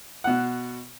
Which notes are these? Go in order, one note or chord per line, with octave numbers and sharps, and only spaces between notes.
B2 F#5